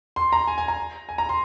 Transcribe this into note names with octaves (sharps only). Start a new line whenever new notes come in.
C6
A#5
G#5
G#5
A#5
G#5
A#5
C6